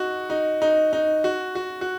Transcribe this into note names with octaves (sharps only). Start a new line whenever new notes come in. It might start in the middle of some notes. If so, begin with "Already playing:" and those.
Already playing: D#4 F#4
D#4
D#4
D#4
F#4
F#4
F#4